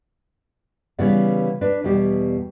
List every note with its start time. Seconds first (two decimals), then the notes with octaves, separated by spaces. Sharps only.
0.99 C#3 E3 G3 B3
1.61 D4 B4
1.84 E2 B2 G3 G4